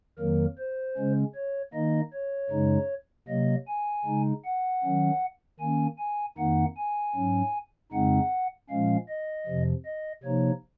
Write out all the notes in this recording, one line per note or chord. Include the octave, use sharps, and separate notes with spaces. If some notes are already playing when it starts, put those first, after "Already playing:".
F2 D#3 F#3 A#3 A#4
C5
C#3 G#3 C#4
C#5
D#3 A#3 D#4 D#5
C#5
F#2 C#3 G#3 D#4
C3 F#3 A#3 D#5
G#5
C#3 G#3 D#4
F#5
D#3 F#3 C#4
D#3 A#3 C#4 G#5
G#5
F2 D#3 A#3 D#4 F#5
G#5
G#2 F#3 C#4
F2 C#3 G#3 C4 D#4 F#5
A#2 F3 G#3 C#4 F5
D#5
F2 C3 F3
D#5
C3 F3 A#3 D#4 C#5